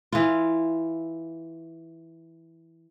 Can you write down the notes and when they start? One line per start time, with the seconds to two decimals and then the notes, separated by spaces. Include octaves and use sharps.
0.12 E3 F4